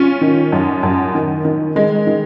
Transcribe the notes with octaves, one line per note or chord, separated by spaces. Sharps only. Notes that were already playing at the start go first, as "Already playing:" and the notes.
Already playing: C#4 F4
D#3
F#2
F#2
D#3
D#3
D#3 G#3
D#3